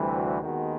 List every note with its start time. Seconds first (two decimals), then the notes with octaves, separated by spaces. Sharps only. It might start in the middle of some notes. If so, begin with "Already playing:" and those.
Already playing: D2 C3 E3 G3
0.12 F#4
0.42 D#2 D#3 G#3 B3 F#4